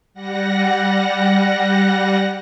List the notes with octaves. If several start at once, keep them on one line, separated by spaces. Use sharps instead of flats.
G3 F#5 A#6